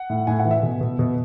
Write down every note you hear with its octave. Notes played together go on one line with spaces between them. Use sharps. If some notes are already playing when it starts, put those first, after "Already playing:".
Already playing: F#5
A2
A2 G#5
F#5
E3
E5
B2
B2
B2